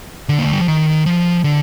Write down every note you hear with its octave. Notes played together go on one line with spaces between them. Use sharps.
D3
A#3
A3
G3
F3
D#3
F3
D3